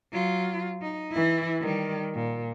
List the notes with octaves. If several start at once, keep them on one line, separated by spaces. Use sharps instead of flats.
F#3 F4
D#4
E3 E4
D#3 G3
A#2